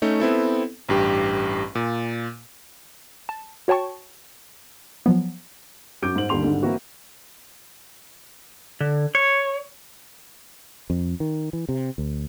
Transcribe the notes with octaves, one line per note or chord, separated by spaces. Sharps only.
A3 C#4 D#4
B3 C4 E4 A4
A1 G2 G4
A#2
A5
F#4 C#5 G5 A5 C#6
F3 F#3 B3
F#2 F#4 D6 G6 D7
G#2 C5 F#7
D#2 D3 G3 A#3 C6 F7
G#1 G#2 D3 G3
E3 A#3 C4 E4 F#4
D3
C#5
F2
D#3
E3
C3
D2